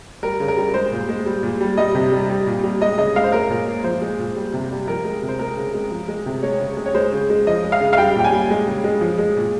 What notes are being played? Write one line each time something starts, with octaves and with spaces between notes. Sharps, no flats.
G3 A#4
C#3
A#4
G3
G#3 C5
A#2
G#3
G3
A#2
G3
G3 D#5
C3
G3
G3
A#2
G3
G#3 D#5
C#3 D#5
G#3 F5
C5
G#3 A#4
A#2
G#3
F3 C5
G#3
A#2
G3
C3
G3
F3 A#4
G#3
C3
C5
G#3 A#4
C#3
G#3
F3
G#3
C3
G#3 C#5
C#3
G#3
C#5
G#3 C5
C#3
G#3
F3 D#5
G#3
F5
C#3
F5
G3 G5
A#2 G5
G#5
G3
G#3
C#3
G#3
F3
G#3
A#2